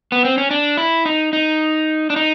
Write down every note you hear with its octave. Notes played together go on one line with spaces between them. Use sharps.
B3
C4
C#4
D4
E4
D#4
D#4
D4
D#4